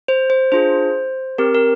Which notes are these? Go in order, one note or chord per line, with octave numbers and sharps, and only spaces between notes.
C5
C5
D4 F4 G#4 C5
C4 G4 A#4
A#4